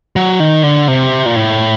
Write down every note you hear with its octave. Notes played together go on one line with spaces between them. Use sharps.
F#3
D#3
D3
C3
A#2
A2